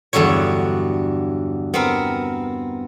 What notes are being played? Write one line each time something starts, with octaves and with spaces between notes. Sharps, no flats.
E2 G2 D3 F#3 C#5
B3 C4 A#4